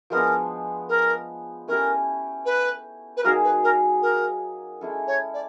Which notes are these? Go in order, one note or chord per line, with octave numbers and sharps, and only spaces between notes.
F3 G#3 B3 D4 A#4
A#4
A3 C#4 E4 G4 A#4
B4
B4
F#3 A#3 D#4 G#4 A#4
B4
A#4
A#4
G#3 C#4 E4 A4
C#5
D5